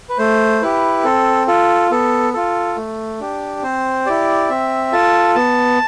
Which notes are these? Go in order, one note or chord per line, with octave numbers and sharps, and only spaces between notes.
B4
A3 C5
E4 G4 B4
C4 A4
F4 A4
B3 A4
F4 A4
A3
D4 G4
C4 C5
E4 G4 D5
C4 E5
F4 A4 A5
B3 A5